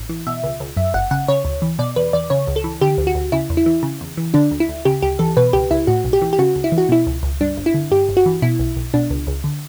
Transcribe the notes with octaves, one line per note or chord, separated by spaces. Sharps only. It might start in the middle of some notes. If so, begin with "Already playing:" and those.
Already playing: A1
E3
B2 E5
C#2
C#2
F#2 E5
G1 F#5
C#3 F#5
C#3 C#5
D2
E3
B2 D5
E2 B4
E2 D5
C#3 C#5
C#2
A4
E3
D3 G4
D2
F#4
D2
C#3 E4
E2
E4
E3
C#3
E2
E3
D3 D4
D2
E4
D2
C#3 G4
D2 G4
E3 A4
B2 B4
C#2 G4
C#2 E4
A2 F#4
B1
G4
E3
G4
C#3 F#4
C#2
E4
E3
F#4
B2 E4
C#2
C#2
G2 D4
G1
E4
D3
G2 G4
G1
F#4
E3
B2 E4
B1
B1
B2 D4
C#2
C#2
D3